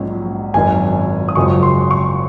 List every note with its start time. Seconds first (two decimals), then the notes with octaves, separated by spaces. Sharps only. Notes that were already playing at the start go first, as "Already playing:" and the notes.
Already playing: A#1 G#2 F#3 C#4
0.54 G#1 F#2 D#3 G#5
1.28 D#6
1.35 F#1 F#2 F3 G#3 C4 C#6
1.63 C6
1.91 C#6